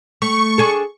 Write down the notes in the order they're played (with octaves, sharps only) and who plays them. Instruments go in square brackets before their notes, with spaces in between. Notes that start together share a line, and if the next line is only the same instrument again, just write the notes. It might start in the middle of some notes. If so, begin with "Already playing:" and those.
[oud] A3 [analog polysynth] C#6
[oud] D4 G#4 A4